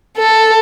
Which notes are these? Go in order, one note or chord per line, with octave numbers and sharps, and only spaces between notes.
A4